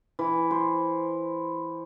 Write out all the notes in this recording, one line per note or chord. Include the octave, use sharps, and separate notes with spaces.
E3
C5